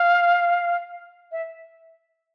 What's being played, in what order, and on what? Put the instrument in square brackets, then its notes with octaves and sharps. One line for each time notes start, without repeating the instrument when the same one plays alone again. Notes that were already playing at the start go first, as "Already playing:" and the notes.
Already playing: [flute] F5
E5